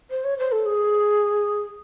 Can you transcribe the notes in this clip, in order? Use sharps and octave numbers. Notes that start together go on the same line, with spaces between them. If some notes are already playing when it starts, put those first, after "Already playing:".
C5
C#5
C5
A4
G#4